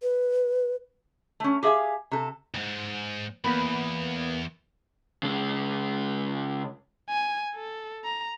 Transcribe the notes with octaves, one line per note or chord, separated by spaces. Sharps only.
B4
A3 C#4
G4 G#4 E5 F5 G#5
C3 A4
D2 G#2
E2 A#3 B3 B5
C#3 G#3
G#5
A4
A#5